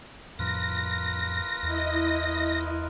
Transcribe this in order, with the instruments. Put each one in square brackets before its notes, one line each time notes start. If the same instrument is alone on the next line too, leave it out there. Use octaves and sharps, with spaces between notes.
[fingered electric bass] F2 A2 F3 [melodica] F4 A#4 B4 [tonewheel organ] A#6
[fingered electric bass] E2 [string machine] E4 D#5